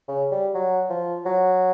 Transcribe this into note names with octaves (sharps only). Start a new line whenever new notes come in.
C#3
G3
F#3
F3
F#3